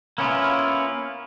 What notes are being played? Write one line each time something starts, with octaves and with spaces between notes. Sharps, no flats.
A#3 B3 C#4 E4 F4